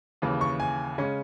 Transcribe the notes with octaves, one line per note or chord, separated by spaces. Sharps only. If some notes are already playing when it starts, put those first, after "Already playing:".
D#2 C#3 E3
C#6
G#5
C#3 G#3 C#4